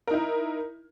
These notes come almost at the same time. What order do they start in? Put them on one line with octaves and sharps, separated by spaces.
A#4 D#4 E4